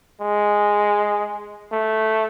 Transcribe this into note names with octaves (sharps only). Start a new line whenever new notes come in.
G#3
A3